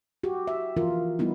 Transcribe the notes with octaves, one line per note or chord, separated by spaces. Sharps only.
F#4 G4
E5
E3 F3 F4 A#4
G3 B3 D#4 E4